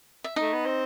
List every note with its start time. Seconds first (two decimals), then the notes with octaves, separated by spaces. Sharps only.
0.24 E5
0.36 A3 D#4 D#5
0.53 B3
0.65 C4